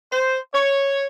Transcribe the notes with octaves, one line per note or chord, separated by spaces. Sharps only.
C5
C#5